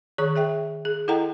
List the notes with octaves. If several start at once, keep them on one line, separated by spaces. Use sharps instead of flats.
D#3 G#4 C#5 A#5 C#6
G#4 E5 G5
G#4
E4 A4 D#5 F#5 G5 A#5